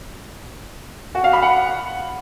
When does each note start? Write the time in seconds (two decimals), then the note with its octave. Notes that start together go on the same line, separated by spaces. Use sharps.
1.15 F#4
1.24 F5
1.33 B5
1.42 F#5